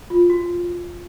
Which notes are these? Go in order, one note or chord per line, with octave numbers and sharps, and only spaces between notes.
F4
F#4